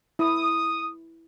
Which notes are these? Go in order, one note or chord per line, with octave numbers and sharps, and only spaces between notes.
E4 D#6